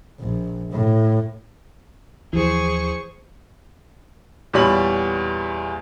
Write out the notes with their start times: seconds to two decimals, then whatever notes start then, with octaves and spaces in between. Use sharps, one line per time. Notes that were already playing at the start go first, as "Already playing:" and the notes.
0.20 A#1
0.71 A2
2.33 D#2 E3 F3 G#4 C5 C#6
4.53 E2 A#2 G3 C#5 B5 F#7